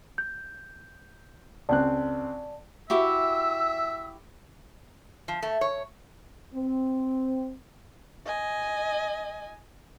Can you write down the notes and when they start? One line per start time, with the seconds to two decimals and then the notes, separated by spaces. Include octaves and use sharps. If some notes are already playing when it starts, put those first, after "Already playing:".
0.18 G6
1.69 C#2 C4 D5 A5 F#6
2.90 E4 F#4 G4 E5 E6
5.28 F3
5.43 A3
5.61 C#5
6.53 C4
8.26 D#5 G#5